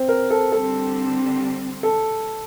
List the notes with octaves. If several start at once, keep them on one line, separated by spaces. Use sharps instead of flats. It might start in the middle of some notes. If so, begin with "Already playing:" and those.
Already playing: C4
A#4
A4
D3 G3 C4 A4
A4